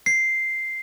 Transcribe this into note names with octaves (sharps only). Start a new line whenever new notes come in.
C7